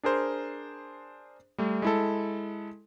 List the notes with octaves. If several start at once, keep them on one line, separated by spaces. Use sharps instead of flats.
D4 G#4 A#4 C5
G3 A3
G#3 E4 A4